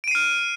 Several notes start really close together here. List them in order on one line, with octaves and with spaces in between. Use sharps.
D7 D#7 C7 F6